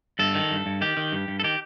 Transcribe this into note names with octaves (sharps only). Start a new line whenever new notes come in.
G2 A4
D#3
G2
G2
D#3 G4
D#3
G2
G2
A4
D#3 G4